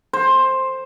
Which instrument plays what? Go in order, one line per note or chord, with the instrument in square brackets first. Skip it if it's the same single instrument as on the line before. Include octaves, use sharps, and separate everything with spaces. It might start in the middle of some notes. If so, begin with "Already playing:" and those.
[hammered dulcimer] C5